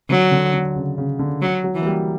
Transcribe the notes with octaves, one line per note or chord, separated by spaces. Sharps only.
D3 F#3
D3
D3
C#3
C#3
D3
F#3
F#3
E3
A#3
G3